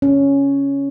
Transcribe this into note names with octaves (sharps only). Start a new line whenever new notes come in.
C#4